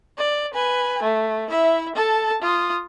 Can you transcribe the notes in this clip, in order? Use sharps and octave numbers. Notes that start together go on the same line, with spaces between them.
D5
B4 G#5
A3
E4 E5
A4 A5
F4 D#6